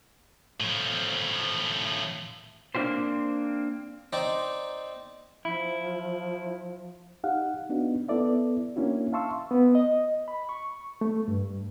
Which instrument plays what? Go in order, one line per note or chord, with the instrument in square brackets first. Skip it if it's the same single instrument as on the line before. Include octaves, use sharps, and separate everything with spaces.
[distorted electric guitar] A2 F3
[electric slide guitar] A#3 C4 D4 F4 G4 C5
[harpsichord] C4 D#4 D5
[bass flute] F3 [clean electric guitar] E4
[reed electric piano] D#4 G4 F5 F#5
B3 D4 D#4 F#4
B3 E4 A4 D5 E5
A#3 C#4 D4 E4 F#4
E5 F5 A5 C6 C#6 E6
B3
D#5
B5
C#6
A3
G2